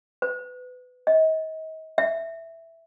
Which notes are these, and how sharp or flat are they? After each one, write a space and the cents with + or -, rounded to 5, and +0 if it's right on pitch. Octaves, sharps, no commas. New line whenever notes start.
B4 +25
D#5 +35
E5 +0